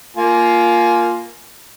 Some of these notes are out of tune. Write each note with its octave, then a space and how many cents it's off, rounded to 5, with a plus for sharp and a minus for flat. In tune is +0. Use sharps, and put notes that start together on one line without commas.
A#3 +0 F4 +0 G#5 +25